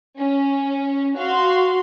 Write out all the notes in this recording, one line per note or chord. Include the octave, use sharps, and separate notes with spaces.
C#4
F#4 F5 C6